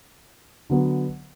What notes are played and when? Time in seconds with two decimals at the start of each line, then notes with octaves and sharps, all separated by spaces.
0.70 D3 F#3 B3